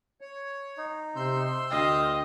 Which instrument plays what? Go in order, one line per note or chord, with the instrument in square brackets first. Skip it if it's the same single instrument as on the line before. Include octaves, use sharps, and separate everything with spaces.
[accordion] C#5
[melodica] D#4
[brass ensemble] C3 [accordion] C6 E6 G6
[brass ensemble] D2 G5 [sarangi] D#5 [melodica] F5